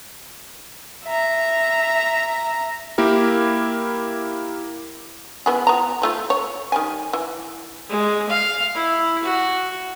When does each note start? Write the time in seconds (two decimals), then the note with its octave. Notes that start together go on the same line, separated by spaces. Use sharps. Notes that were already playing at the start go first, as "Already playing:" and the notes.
1.04 E5 A#5
2.98 A#3 E4 G4 A#4
5.46 E3 B3 G#4
5.67 B3 F4 A#5
6.02 F3 A3 F4
6.30 C#5
6.72 D#3 G3 G#5
7.13 E3
7.89 G#3
8.29 F5
8.74 E4
9.23 F#4